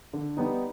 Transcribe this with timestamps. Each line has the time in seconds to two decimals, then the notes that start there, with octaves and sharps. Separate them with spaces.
0.13 D3
0.37 G3 B3 D#4